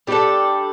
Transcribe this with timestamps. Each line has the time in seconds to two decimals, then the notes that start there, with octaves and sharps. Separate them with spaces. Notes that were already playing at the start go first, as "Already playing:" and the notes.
0.07 G3 D4 G4 A4